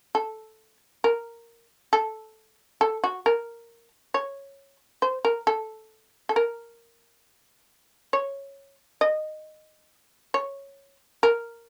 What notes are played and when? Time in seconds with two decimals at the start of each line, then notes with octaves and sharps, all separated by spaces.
0.15 A4
1.04 A#4
1.93 A4
2.81 A4
3.04 F#4
3.26 A#4
4.14 C#5
5.02 C5
5.25 A#4
5.47 A4
6.29 A4
6.36 A#4
8.13 C#5
9.01 D#5
10.34 C#5
11.23 A#4